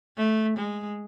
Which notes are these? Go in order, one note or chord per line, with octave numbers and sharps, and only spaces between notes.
A3
G#3